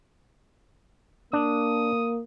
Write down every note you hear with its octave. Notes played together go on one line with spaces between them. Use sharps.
A#3 D4 D#6